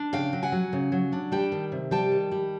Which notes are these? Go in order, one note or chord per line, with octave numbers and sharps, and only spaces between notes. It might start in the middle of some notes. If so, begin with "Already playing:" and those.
Already playing: D4
C#3 F5 G5
F#3
F#5 G#5
F#3
C#3
F#3
D4
G3 G5 A5
D#3
C3
G3 G5 A5
D#3
G3